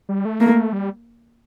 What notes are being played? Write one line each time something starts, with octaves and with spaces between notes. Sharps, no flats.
G3
A3
A#3
G3